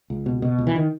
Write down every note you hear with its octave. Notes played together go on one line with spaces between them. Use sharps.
C#2
B2
B2
C#2
E3
D#3